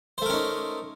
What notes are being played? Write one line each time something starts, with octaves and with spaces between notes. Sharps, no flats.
A3 C#4 D#4 A#4 C5